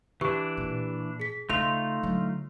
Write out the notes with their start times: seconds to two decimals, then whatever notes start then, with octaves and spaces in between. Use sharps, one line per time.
0.21 E3 D4 G4 C#6
0.57 A#2
1.20 G#4 B6
1.49 C#3 A3 D#4 F4 C6 F7
2.03 D3 F#3